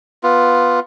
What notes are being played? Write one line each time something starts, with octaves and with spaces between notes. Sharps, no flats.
B3 F4